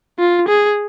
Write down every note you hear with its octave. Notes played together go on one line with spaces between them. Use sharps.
F4
G#4